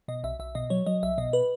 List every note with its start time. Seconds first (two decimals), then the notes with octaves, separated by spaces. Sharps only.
0.08 B2 D#5
0.24 B1 E5
0.40 B1 E5
0.55 B2 D#5
0.70 F#3 C#5
0.86 F#3 D#5
1.03 B1 E5
1.18 B2 D#5
1.33 B4